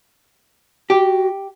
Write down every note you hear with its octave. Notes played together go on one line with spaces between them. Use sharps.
F#4 G4